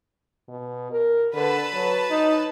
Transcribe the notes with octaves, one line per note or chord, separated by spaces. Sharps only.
B2
A#4
D3 B4 A5
F#3
D#4